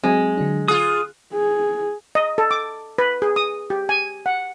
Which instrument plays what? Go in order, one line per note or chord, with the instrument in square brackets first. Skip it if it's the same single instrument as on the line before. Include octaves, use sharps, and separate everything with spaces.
[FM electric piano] F#3 C4 [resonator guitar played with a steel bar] G#3
[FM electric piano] D3 F#3 D4
[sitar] F4 G#4 [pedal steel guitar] D#6 [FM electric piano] F#6
[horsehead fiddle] G#4
[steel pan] D#5
A4
D6
B4
G#4
D#6
G4
G#5
F#5